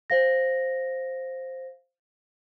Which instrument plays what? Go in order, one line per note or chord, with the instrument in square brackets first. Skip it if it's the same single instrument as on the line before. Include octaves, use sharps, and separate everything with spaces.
[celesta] C5 F5 A#6